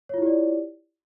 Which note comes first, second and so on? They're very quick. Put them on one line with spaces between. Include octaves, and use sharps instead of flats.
C#5 F4 E4 G4 D5